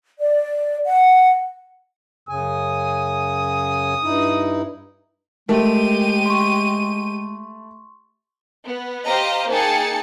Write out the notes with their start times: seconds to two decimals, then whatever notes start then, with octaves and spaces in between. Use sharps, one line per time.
0.20 D5
0.85 F#5
2.29 F#2 C#3 G#5 D#6
4.04 G2 D#4 E4
5.49 G#3 A3 G4 A#4 D#7
6.26 C6 C#6
8.64 B3
9.04 G4 C5 D#5 F5 A#5
9.50 A#3 D#4 G#4 G5 A5 C#7